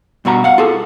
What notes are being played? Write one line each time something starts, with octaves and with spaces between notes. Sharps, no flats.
G2 B2 F#4 A#5
F5 F#5
F4 G#4 A4